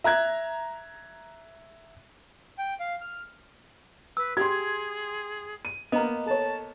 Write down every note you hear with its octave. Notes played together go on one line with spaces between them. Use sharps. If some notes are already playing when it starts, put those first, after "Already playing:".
E5 A#5 F#6 G#6
G5
F5
F6
B4 E6
G4 G#4 C6 G#6
D#7
A#3 B3 D#5 A#5
A4 C#5 A5